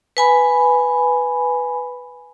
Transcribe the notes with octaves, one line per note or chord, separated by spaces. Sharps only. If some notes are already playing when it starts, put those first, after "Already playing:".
B4 G#5 B5